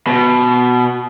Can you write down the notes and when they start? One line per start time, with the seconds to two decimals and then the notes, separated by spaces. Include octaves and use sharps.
0.07 B2